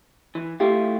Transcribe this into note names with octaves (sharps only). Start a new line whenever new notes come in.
E3
A3 E4 F4 G4